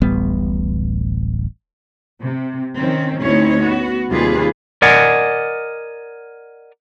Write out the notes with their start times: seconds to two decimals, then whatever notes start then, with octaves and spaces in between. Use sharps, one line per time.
0.02 D1 A1 G3 B3
2.22 C3
2.77 D#3 C4 C#4
3.21 D2 C4 C#4 D#4 E4 C#5
3.57 B3 F#4
4.10 D#2 C3 G3 F4 G#4 B4
4.82 A#4 D5 D#5 F#5 G#5